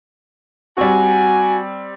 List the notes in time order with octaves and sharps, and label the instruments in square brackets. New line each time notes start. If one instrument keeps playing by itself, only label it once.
[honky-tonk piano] G3 C4 [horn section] F#4 G#5